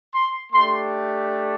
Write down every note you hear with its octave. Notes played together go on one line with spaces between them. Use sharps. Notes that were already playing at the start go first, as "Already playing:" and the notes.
C6
A3 D4 G4 C6